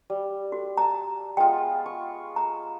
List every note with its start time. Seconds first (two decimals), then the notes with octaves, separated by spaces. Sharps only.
0.10 G3
0.52 F#4
0.77 A5 A#5
1.37 G#3 B3 F4 G5
1.86 C#6
2.36 A#5